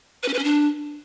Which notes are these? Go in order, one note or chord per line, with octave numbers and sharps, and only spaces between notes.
B4
C#4
B4
C#4
D4